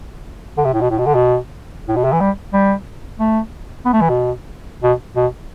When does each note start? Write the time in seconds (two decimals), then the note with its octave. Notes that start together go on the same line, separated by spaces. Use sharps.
0.57 D3
0.65 C3
0.73 A2
0.81 B2
0.90 A2
0.98 B2
1.06 D3
1.15 B2
1.88 A2
1.96 B2
2.04 C3
2.12 E3
2.20 G3
2.53 G3
3.20 A3
3.85 B3
3.93 A3
4.01 E3
4.09 B2
4.83 B2
5.16 B2